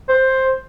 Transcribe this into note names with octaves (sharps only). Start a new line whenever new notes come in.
C5